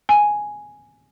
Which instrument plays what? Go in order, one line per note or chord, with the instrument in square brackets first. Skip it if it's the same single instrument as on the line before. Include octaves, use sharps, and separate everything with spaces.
[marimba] G#5